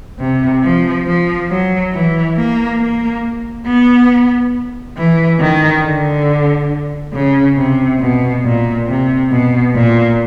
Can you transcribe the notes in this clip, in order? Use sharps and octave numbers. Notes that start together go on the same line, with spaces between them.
C3
F3
F3
F#3
E3
A#3
A#3
B3
E3
D#3
D3
C#3
C3
B2
A#2
C3
B2
A#2